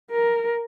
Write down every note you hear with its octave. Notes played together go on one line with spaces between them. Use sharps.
A#4